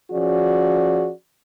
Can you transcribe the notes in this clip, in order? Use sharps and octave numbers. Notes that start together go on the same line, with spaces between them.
F3 C#4 F#4 G#4 D5